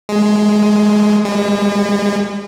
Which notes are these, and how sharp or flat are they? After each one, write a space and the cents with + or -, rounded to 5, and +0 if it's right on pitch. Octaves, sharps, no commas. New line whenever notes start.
G#3 +10
G#3 -45